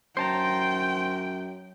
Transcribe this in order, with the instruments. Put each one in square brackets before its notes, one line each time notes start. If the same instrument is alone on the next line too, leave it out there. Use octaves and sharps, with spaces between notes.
[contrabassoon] F#2 [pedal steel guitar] C5 A5 A#5 [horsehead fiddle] G5